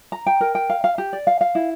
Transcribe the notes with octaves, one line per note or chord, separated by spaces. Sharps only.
A#5
G5
A#4
G5
F5
F5
G4
D5
F5
F5
E4